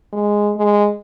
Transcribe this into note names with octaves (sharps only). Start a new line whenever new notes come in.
G#3
G#3